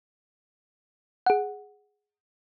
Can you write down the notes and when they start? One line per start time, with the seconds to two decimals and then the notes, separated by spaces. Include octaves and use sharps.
1.26 G#4 F#5